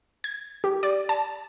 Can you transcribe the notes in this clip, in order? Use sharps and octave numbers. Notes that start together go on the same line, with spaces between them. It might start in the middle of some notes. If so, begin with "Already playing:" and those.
G#6
G4
D5
A5